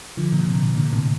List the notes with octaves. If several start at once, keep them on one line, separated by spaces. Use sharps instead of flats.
D3 F3
A#2 D3
A#2
A2 C3
A#2 D3
A2 C3